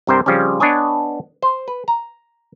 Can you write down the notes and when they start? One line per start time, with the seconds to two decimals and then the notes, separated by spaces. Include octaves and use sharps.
0.07 C2 G2 C3 A#4 C5 G5
0.26 C#3 F3 G3 C4 C#4
0.60 B3 D4 B4 C#5 D#5 G#5
1.42 C5
1.68 B4
1.88 A#5